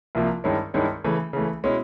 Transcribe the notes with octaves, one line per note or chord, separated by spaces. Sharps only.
C2 C3 F3 A#3
G2 D#3 G#3 C#4 E4
G2 D#3 G#3 C#4 E4
C#3 E3 A3
C#3 E3 A3
B2 G#3 C#4 E4